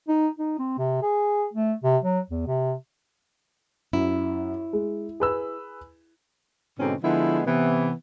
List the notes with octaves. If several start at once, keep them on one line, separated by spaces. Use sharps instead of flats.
D#4
D#4
C4
C3
G#4
A3
C3
F#3
E2
C3
F#2 E4
G#3
G#4 B4 E6
G#2 B2 D3 C4 C#4 D#4
D3 F3 G#3 B3 E4 G#4
C3 E3 B3